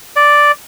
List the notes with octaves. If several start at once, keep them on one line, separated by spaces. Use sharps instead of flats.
D5